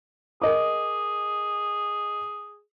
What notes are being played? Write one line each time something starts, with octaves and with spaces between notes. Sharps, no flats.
G#4 A#4 D#5 D6